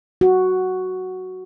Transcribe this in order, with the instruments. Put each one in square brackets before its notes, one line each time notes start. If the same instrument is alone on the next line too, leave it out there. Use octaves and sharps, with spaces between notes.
[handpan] F#4